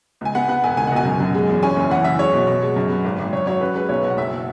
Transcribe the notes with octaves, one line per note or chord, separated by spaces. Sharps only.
C#2 G#5
B3 F#5
B3 F#5
E1 G#5
C#2 G#5
F#5
B2
G#5
F#2
F#2
G#3
E2
C#4 G#5
F#1
E3 F#5
F#2 E5
G#3 C#5
B2
B2
G#3
F#2
B3
G#1
G#1
F#2 C#5
F#3 C#5
C#4 B4
G#3 B4
B1 C#5
B2
F#5
F#1 E5